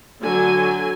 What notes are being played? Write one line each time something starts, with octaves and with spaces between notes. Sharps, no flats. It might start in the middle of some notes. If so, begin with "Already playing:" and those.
D3 F#3 G#5